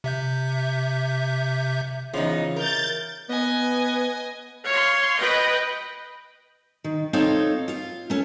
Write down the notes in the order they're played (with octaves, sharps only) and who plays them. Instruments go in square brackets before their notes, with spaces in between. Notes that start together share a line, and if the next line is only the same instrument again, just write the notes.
[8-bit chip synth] C3 E5 G6
[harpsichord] C#3 E3 [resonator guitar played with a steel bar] F3 B3 D#4
[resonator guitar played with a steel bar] A#4 [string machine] G6 A6
[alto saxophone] B3 [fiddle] D#5 G#5
[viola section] C#5 F5 C6
B4 D#5 G5
[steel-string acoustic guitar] D#3
C4 D#4 F4 A4 C#5 F5
F4 F5
A3 C#4